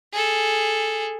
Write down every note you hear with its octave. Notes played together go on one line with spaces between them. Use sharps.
G#4 A4